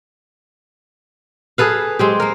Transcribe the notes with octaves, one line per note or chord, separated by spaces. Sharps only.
G#4 A4 B4 F5
G#3 C4 G4
A#3 A#4